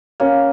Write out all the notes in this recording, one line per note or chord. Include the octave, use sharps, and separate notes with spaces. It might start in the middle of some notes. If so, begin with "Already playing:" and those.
A#3 C#4